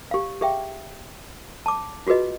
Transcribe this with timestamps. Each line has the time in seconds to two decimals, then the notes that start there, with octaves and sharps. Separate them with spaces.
0.11 G4 F5
0.41 G4 G#4 E5 F5 G5
1.66 A5 D6
2.07 F4 F#4 G#4 B4 D#5